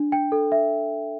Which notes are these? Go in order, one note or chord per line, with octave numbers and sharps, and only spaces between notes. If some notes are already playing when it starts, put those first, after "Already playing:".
Already playing: D4
G5
A4
E5